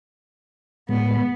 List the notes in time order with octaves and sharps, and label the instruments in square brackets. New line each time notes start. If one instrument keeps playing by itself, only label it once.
[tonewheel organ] A2 G#3 [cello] B3